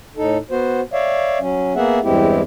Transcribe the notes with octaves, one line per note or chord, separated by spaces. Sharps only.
A2 D#4 A4
B3 F#4 C5
C#5 D5 E5 F5
F#3 C#4
A#3 B3 G#4 E5 F#5
E2 G2 G#3 C4 E4 G4